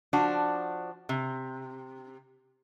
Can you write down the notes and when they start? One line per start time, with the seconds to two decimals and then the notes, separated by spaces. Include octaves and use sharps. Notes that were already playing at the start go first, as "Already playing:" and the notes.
0.13 F3 D4 F#4
1.09 C3